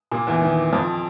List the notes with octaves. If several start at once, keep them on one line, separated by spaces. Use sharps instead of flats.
A#2 A#3
E2 E3
D#3
F2 F3